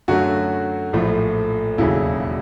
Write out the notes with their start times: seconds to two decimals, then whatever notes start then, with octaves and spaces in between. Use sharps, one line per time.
0.08 F#2 D3 F#3 A3 F#4
0.93 A#1 A2 F3 A3
1.78 E1 D#2 C#3 F#3 E4